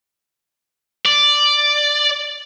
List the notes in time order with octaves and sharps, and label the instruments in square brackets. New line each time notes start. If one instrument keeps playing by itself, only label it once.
[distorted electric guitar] D5